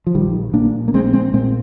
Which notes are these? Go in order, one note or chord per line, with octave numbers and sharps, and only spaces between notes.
F3
A#1 D#3 G3
A#2 A#3 D4
A#3
A#1 G#3 C4
G#3 C4
A#2 G#3 C4